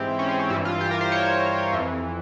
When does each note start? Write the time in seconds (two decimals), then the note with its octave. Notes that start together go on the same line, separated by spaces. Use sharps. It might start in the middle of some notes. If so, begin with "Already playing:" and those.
Already playing: G#2 E3 C4 G4
0.19 C#4
0.29 C4
0.40 C#4
0.50 G2 E3 E4
0.65 F4
0.81 G4
0.91 A#4
1.01 C5
1.12 C#5
1.73 F2 E3